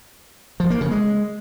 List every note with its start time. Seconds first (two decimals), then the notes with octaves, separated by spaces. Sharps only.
0.60 F3
0.70 A#3
0.81 C#3
0.91 G#3